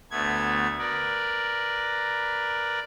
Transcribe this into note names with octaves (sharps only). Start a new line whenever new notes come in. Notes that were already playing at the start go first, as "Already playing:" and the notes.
D2 A3 B3 G#6
A#4 B4 D5